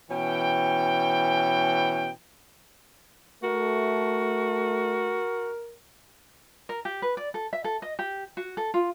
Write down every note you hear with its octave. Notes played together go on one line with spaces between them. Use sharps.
B2 E3 C#4 G5
A3 F#4 A#4
A#4
G4
B4
D5
A4
E5
A4
D#5
G4
F#4
A4
F4